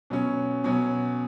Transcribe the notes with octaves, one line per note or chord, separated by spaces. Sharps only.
B2 F#3 C#4
B2 F#3 C#4